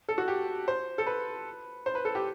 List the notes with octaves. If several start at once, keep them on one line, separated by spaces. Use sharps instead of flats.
A4
F#4
G4
C5
A4
B4
C5
B4
A4
G4